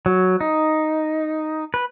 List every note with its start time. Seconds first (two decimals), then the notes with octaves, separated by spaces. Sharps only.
0.06 F#3
0.41 D#4
1.74 B4